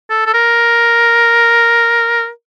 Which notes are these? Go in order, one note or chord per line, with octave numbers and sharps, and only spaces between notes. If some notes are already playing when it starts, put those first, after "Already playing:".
A4
A4
A#4